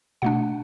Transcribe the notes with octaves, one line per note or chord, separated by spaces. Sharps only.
B2 A3 D4 F#5